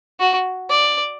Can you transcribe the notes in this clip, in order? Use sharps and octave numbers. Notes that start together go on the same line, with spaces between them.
F#4
D5